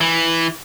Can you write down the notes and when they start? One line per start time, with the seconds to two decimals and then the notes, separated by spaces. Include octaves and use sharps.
0.01 E3